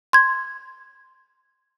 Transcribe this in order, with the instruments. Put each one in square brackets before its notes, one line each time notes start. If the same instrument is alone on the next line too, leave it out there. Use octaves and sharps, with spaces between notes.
[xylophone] C6 G#6